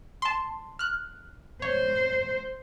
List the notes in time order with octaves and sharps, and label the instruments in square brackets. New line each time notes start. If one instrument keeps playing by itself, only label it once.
[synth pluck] A5 C6
F6 F#6
[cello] C5 [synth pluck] C#5